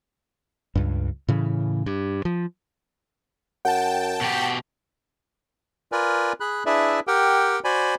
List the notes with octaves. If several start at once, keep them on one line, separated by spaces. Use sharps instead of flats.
C#2 G2
A2 C#3 E3
G2
F3
F#2 F#5 G5 A5
B2 G4
F4 A#4 B4 D5 G#5
G#4 B5 F#6
D4 E4 G#4 B4 D5 E5
G4 A#4 F#5 G5
F#4 C5 D5 G#5 B5